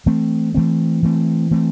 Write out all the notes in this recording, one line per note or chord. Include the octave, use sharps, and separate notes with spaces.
E3 A3 C4
E3 A3 C4
E3 A3 C4
E3 A3 C4